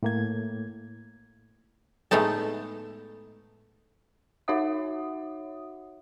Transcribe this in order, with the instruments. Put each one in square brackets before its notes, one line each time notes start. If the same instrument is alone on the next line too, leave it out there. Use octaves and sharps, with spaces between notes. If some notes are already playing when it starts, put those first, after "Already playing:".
[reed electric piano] A2 A#3 G#6
[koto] A2 G#3 A3 B3 D#4 A4
[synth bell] D#4 F#4 C#5 E5 F#5 D#6